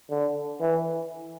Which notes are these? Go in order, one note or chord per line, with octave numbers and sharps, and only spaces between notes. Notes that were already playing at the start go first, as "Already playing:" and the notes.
D3
E3